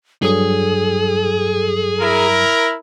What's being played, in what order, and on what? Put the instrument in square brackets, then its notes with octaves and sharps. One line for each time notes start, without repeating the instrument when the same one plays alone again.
[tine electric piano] G2 F#3 D#6 [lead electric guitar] G#4 [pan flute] A4
[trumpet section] E4 A#4